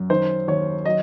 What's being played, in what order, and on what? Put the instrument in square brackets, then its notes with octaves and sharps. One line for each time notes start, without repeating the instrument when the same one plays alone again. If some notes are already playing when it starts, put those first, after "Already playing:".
Already playing: [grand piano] F#2
D#3 C5
D#2 C#5
F#3 D#5